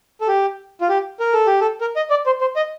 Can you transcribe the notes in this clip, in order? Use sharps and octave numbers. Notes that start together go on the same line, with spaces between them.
A4
G4
F4
G4
A#4
A4
G4
A4
A#4
D#5
D5
C5
C5
D#5